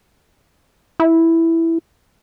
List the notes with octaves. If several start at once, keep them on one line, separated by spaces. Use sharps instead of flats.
E4